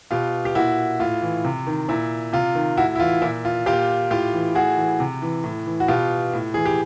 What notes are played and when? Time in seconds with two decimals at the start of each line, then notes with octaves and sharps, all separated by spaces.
0.11 B2 F4 G4
0.45 G4
0.55 A#2 E4 F#4
1.00 A2 F4
1.22 E3
1.45 C3
1.67 D#3
1.89 A#2 E4
2.33 C3 F4
2.55 D#3
2.77 A2 E4 F#4
2.96 E4
3.00 E3 F4
3.22 A#2 E4
3.45 F4
3.66 A#2 F4 G4
4.11 A2 F4 G4
4.33 E3
4.55 A2 F#4 G#4
4.77 E3
5.00 C3
5.22 E3
5.44 A2
5.66 E3
5.80 F#4
5.88 B2 F4 G4
6.33 A2
6.54 E3 G#4
6.65 G4